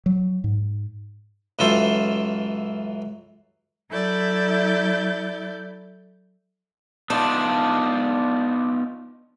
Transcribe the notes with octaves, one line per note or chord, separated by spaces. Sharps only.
F#3
G#2
C#2 F#2 E3 F4 A4 C5
F#3 E4 A4 D5 G6
B3 D4 D#4 F4